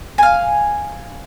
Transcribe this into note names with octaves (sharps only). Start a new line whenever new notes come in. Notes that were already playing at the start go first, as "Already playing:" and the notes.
F5 G#5